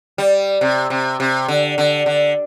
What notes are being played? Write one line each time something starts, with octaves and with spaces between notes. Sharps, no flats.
G3
C3
C3
C3
D3
D3
D3